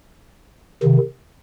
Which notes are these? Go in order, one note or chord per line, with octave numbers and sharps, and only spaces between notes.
C3 D#3